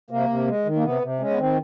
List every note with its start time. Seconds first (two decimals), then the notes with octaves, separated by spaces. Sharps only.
0.10 C3 A#3
0.29 C3
0.48 G#3
0.65 D#3
0.76 A#3
0.84 C3 B3
1.02 C3
1.20 G#3 C#4
1.30 B3
1.38 D#3 C4